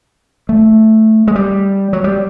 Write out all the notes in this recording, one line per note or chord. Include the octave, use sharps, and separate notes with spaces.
A3
G#3
G3
F#3
G3